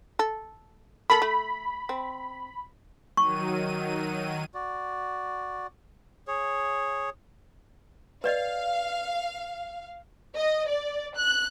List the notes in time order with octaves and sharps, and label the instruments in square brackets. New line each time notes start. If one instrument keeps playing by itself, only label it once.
[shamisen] A4
[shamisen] A#3 A4 [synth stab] B5
[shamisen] A3
C4
[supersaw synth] D#3 F#3 D#7 [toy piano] C#6
[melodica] F#4 D5
G#4 C#5
[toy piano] B4 D5 D#5 [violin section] F5
[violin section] D#5
D5
F#6